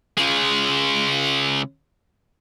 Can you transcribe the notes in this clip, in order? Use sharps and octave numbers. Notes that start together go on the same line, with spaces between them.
C#3 G#3